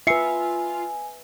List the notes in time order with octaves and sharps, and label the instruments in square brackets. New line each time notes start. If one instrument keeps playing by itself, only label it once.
[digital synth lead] F4 [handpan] B4 E5 [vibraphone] G#5 [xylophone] C7 C#7